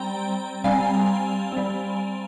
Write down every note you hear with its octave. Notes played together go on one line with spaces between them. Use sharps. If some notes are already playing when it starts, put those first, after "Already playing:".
Already playing: G3 C4 G5 A#5
G3 C4 F5 G#5
G3 C4